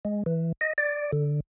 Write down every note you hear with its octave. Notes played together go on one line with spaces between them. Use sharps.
G#3
E3
D#5
D5
D3